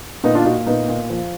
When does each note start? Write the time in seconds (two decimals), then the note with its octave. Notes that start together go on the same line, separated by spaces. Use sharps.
0.24 A#2 B3 D#4
0.34 D4 F4
0.45 A#2 D#4 F#4
0.66 A#2 B3 D#4
0.89 A#2
1.10 F3